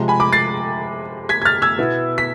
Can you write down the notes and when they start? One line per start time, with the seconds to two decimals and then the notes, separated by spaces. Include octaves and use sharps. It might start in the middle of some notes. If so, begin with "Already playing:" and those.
Already playing: C3 F3 G#3
0.08 G#5 B5
0.20 B5 D6
0.33 A6 C7
1.29 G#6 B6
1.42 G#6
1.45 F6 A6
1.62 E6 G#6
1.78 B2 B3 E4
2.18 B6